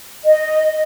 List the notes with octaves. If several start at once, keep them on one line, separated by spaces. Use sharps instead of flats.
D#5